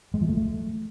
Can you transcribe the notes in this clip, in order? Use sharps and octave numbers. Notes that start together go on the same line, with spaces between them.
G#3
F3
A3